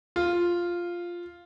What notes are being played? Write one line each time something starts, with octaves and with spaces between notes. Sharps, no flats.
F4